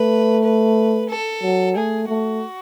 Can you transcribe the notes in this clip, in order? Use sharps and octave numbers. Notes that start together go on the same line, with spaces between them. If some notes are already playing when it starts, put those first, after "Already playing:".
Already playing: A3 B4
B4
A4
F#3
A3 G#4
A3 F#4